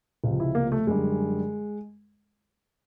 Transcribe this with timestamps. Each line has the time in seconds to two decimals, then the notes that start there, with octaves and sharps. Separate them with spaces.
0.24 C#2 C3 F3
0.40 E4
0.55 A#3
0.72 A3
0.87 F#2 D3 G3 G#3